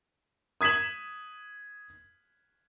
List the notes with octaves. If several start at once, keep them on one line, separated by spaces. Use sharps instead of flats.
D#6 G#6 B6 E7 F#7